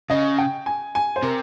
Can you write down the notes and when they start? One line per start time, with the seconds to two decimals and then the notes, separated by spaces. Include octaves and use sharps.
0.10 C#3 D#5
0.38 G5
0.66 G#5
0.95 G#5
1.16 C5
1.23 C3 A#4